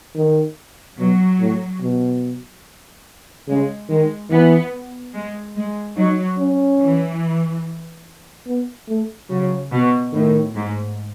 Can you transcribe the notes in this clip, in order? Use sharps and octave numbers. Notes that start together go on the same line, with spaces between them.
D#3
B2 F#3
A2
B2
C#3 G#3
D#3 G#3
E3 B3
G#3
G#3
F#3 D#4
C#4
E3
B3
A3
C#3 F#3
B2
A2 D#3
G#2